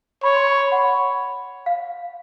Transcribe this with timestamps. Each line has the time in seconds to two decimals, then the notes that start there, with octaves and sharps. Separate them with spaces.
0.23 C#5 B5
0.36 C6
0.47 B5
0.59 B5
0.72 F#5
1.66 F5